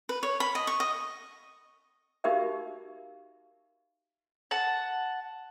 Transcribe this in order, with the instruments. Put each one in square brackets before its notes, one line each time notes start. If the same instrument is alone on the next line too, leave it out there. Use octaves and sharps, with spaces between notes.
[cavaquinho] B4
C#5
B5
D#5
C#6
D#5
[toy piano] D#4 F#4 G4 A#4 E5 F5
[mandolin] F#5 A5